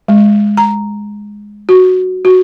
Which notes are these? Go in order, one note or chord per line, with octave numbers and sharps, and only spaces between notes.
G#3
A#5
F#4
F#4